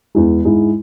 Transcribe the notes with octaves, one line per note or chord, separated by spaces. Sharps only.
E2 E3 G#3 E4
G#2 G#3 E4